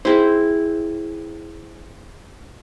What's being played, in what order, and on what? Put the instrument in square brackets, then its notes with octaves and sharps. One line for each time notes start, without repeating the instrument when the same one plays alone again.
[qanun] C4 E4 [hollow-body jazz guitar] G#4 C5